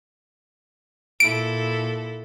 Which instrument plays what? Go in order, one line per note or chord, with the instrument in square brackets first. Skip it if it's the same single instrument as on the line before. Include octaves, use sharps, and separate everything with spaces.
[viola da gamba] A#2 E4 A4 [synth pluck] D7